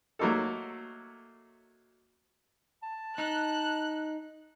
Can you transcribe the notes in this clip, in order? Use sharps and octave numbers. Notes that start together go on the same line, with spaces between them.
F#3 A3 A#3 D#4 A4
A5
D#4 F#6